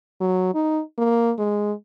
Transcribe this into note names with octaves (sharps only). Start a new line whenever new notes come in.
F#3
D#4
A#3
G#3